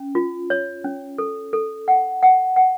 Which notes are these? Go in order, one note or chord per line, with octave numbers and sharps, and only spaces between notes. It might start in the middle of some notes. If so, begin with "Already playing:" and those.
Already playing: C#4
F4
C#5
C#4
A4
A4
F#5
F#5
F#5